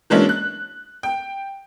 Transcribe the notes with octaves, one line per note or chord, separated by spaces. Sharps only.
E3 F#3 G#3 A#3 C#4 D4
F#6
G5